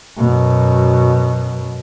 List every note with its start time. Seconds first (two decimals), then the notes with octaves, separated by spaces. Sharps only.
0.17 F#2 B2